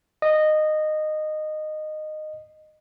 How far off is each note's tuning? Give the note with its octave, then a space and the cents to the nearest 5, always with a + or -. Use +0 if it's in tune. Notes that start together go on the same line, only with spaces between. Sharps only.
D#5 -15